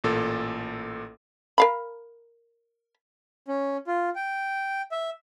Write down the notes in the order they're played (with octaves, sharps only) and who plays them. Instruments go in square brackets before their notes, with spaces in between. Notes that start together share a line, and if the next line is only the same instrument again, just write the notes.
[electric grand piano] A1 A#2 A4
[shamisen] A#4 F5 B5
[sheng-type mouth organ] C#4
F4
G5
E5